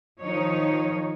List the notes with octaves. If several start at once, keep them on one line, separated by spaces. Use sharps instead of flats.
D#3 F3 D#4 C#5